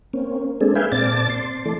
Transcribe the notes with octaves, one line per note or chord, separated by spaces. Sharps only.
A#3 C4 C#4
G#3 A#3 C4 D4 G#4 A4
G#4 B4 E5 F5 G5 G#5
A#2 C4 D5 A5 A6
C6
E3 A3 A4 D5